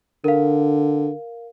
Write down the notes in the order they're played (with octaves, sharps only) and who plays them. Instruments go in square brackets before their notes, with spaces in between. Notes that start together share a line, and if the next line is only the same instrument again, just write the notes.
[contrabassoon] D3 [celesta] A#4 F5